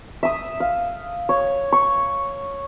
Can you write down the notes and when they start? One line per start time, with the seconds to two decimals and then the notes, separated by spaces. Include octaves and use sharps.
0.23 E5 D#6
0.60 F5
1.29 C#5
1.72 C#6